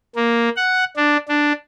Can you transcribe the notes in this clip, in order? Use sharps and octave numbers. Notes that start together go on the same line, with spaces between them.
A#3
F#5
D4
D4